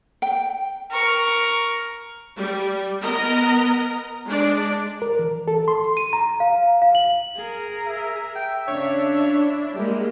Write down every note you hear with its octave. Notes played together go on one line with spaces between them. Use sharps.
G5
A#4 C#6
G3
B3 A#4 D#5 A#5
G#3 D4 D5
A#4
E3
A4
C6
D#7
A#5
F5
F5
F#7
G#4 A#4
E5
G5
C#3 D4 C#5
E4
G3 G#3 A#3 G4